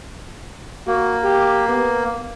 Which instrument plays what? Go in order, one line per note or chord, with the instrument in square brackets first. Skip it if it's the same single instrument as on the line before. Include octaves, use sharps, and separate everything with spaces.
[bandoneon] A#3 [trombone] F#4
[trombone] G4
B3